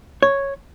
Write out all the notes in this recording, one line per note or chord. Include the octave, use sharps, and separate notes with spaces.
C#5